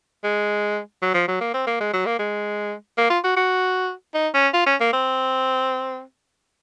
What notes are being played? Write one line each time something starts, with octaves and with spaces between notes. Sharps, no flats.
G#3
F#3
F3
F#3
A#3
C4
A#3
G#3
F#3
A#3
G#3
A#3
F4
F#4
F#4
D#4
C#4
F4
C#4
A#3
C4